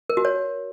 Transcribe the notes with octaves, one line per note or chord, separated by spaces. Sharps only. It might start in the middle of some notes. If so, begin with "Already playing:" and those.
A#4
F#4
C#5